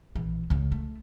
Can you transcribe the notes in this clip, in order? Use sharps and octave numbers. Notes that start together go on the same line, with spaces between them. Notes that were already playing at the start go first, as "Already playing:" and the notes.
A#1 E3
C#2 C#3
A3